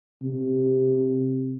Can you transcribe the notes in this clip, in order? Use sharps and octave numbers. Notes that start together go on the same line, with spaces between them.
C3